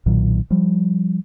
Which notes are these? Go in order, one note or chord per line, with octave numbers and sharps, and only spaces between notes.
B1 A#2 D#3 F#3
F3 G3